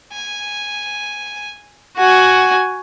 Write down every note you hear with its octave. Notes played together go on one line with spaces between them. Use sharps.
G#5
F#4 F#5 G#5